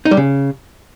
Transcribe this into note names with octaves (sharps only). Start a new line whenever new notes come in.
D#4
G3
C#3